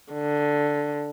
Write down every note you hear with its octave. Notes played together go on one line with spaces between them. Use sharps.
D3